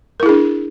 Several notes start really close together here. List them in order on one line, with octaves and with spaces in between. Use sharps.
A#4 E4 G#4 D4